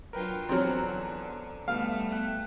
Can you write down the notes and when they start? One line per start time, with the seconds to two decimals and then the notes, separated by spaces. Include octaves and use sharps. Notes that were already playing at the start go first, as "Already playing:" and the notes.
0.13 F#3 D4 F4 A#4 B4 G5
0.49 E2 D3 F#3 C4 A#5 F6
1.68 B2 G3 A3 B3 F5
2.11 G5 F#6